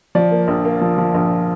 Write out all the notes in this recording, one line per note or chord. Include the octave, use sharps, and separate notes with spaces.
F3 D5
A#3
A#1
A#3
F3
F3
A#1